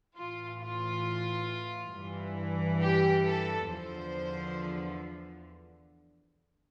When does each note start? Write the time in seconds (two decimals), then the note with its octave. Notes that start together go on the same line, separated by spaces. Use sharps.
0.17 A2 E3 F4
0.61 F4
1.94 G2 E3
2.82 G4
3.25 A4
3.69 E2 D3 F3 C5